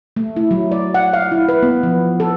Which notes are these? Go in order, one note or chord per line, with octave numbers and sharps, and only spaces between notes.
A3
E4
F#3
D5
F#5
F5
E4
B4
B3
F3
A4